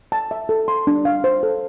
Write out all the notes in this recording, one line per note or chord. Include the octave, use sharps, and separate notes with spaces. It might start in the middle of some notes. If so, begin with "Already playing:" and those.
A5
E5
A4
C6
D4
F5
C5
A4